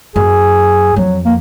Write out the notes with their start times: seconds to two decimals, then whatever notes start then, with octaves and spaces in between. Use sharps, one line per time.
0.16 F#2 G#4
0.96 F2 F#3
1.25 A#3